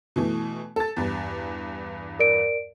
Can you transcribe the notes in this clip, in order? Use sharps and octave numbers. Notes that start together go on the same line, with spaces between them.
B2 E3 A3
A4 A6
E2 G2
A#4 D5 D7